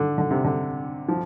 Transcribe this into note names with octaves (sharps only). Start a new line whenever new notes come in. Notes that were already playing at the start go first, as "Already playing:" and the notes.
Already playing: D3
D3
C3
D3
F3